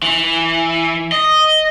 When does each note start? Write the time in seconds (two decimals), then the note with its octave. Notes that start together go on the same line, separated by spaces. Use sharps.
0.02 E3
1.12 D#5